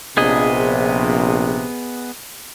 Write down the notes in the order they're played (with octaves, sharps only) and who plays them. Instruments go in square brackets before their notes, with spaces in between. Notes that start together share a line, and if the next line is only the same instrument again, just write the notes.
[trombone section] A#1 C3 [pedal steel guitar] B3 G#4 D#5